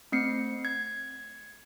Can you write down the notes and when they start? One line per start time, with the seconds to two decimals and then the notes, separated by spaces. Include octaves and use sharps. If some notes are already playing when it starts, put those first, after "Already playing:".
0.12 A3 C4 C7 C#7
0.65 G#6